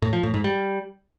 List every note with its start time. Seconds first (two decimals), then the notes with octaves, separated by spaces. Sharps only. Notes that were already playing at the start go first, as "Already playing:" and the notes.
0.02 A2
0.13 F3
0.23 A2
0.34 G#2
0.44 G3